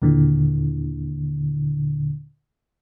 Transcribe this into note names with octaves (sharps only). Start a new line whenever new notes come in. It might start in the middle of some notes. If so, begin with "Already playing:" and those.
D#2 A#2 D3 E3